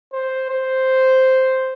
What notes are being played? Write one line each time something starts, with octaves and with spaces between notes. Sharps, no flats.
C5
C5